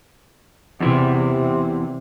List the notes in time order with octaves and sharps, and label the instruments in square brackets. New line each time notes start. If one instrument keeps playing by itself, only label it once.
[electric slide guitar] E2 E3 [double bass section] C3